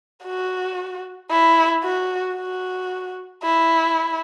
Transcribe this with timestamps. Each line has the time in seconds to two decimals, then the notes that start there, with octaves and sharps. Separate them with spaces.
0.24 F#4
1.30 E4
1.84 F#4
2.36 F#4
3.43 E4